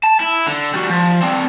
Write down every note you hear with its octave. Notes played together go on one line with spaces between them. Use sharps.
A5
E4
D3
G3 F#4
F3
C4 D4